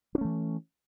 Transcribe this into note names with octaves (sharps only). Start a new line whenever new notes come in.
E3 A3 C#4 D4